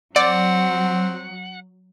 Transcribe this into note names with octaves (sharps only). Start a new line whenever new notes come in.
F#3 C4 D5 F#5